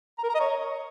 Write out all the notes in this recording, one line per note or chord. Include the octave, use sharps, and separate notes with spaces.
A#5
A#4
A#5
D#5
C#5